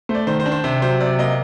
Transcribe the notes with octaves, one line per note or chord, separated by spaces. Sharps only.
A3 C5
D5
D#3 C5
C5
D4
C5
C3 C5
F#3 C5
C3 D5
A#3 D#5